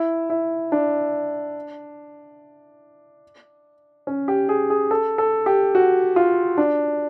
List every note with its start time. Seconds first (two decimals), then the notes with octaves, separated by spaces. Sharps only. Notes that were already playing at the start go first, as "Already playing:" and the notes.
Already playing: E4
0.30 E4
0.72 D4
4.07 C#4
4.28 G4
4.49 G#4
4.70 G#4
4.91 A4
5.18 A4
5.46 G4
5.75 F#4
6.16 F4
6.58 D4